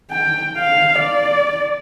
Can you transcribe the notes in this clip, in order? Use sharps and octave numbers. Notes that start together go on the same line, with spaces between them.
G5
F5
D5